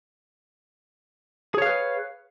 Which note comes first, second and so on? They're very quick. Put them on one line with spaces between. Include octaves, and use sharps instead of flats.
G#4 C#5 F5 B4